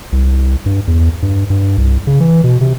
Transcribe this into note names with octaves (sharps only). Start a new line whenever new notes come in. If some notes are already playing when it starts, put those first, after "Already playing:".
C2
G2
E2
G2
G2
C2
C#3
E3
B2
C3